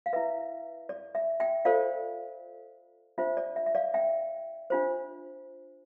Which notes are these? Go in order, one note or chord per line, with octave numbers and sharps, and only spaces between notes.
F5
E4 B4 E5
D5
E5
E5 G5
F4 A4 C5 D5 F5
D4 F4 C5 E5
D5
E5
E5
D5 F5
E5 G5
D4 F4 C5